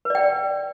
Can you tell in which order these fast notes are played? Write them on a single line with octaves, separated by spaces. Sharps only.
B4 D5 G5